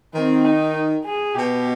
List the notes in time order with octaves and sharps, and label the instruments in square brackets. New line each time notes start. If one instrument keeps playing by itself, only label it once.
[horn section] D#3 [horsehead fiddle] C4
[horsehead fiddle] D#4
G#4
[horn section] B2 [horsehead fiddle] G4